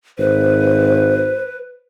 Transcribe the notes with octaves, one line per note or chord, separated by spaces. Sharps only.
G#1 B4 C5